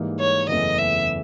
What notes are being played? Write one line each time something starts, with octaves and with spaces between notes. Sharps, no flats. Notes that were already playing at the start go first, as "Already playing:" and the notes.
Already playing: G#2 E3 G3 A#3 D#4
C#5
F#1 E2 C#3 E3 A3 D#5
E5